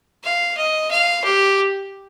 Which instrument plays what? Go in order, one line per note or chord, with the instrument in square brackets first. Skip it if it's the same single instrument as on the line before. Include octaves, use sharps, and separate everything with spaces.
[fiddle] F5
D#5
F5
G4